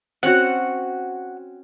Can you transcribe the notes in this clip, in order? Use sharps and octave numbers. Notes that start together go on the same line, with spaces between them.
C4 C#4 F#4 F#5